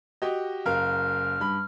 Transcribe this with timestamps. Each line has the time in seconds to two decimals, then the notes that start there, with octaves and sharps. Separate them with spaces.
0.22 F#4 G4 D#5
0.66 F#1 A#4 F5 F6
1.40 G2 B5